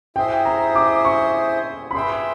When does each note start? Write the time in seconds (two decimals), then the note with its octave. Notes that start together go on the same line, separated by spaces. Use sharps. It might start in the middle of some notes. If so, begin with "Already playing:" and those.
0.16 E4 G#4 C5 D#5 G5
0.45 A#5
0.75 D6
1.05 C#6
1.91 B5
1.94 G#4 B4 E5 G5 C6